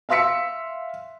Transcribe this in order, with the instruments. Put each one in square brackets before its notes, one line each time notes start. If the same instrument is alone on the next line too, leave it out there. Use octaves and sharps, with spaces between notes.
[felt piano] E5 F5 C6 E6 B6 C#7